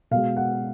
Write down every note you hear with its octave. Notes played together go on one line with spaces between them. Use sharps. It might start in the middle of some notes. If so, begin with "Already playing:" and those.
B2 G#3 F5
F#5